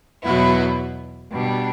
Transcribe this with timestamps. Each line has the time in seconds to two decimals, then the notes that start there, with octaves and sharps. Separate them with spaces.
0.23 E2 B2 F#3 B3 E4
1.31 B2 G3 D4